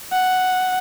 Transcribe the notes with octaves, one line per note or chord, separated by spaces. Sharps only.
F#5